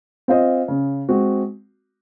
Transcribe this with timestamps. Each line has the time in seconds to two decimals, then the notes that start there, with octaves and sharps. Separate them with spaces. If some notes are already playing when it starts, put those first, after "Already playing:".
0.28 C4 F4 C5 D#5
0.68 C#3
1.09 G#3 C4 F#4